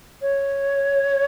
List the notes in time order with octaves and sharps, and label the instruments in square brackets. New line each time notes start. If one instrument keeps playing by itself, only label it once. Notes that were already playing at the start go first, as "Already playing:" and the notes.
[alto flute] C#5